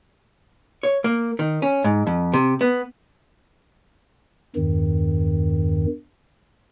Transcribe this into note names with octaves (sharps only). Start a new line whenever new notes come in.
C#5
A#3
D#3
C#4
G#2
F2
C3
B3
E2 G2 D#3